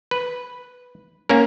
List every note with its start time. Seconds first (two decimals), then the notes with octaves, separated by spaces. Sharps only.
0.11 B4
1.29 A#3 C#4 A#4